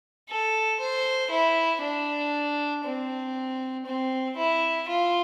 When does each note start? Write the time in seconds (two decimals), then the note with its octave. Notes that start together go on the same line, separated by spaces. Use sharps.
0.29 A4
0.80 C5
1.31 E4
1.81 D4
2.85 C4
3.86 C4
4.37 E4
4.88 F4